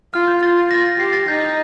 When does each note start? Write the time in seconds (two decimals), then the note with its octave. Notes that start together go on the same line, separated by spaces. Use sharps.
0.14 F4 F6
0.28 G6
0.43 F4 A6
0.57 A6
0.71 F4 A#6
0.86 A#6
0.99 G4 C7
1.13 A6
1.28 D#4 G6